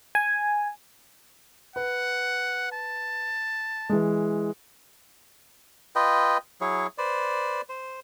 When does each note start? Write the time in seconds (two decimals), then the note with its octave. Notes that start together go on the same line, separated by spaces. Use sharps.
0.15 G#5
1.76 B4 F#5
2.72 A5
3.89 E3 G#3
5.96 F4 B4 D#5 G5
6.61 F#3 E4 G#4 C#5
6.98 B4 C5 D5
7.69 C5